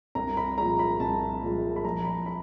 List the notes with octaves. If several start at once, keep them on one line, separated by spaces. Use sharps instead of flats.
C2 A#5
B5
A#2 F3 G#3 A#5
B5
C2 A5
A#2 F3 G#3
B5
A#1 A#5
B5
B5